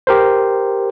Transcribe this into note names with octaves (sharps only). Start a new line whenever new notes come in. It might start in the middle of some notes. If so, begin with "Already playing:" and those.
G4 A#4 C5